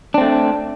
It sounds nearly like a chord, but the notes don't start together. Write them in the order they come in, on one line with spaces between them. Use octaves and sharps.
D4 C4 A3